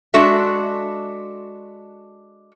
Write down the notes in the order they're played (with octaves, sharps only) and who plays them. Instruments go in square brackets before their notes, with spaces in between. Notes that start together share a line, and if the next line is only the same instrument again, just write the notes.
[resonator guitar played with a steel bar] G#3 D4 F#4 A4 E5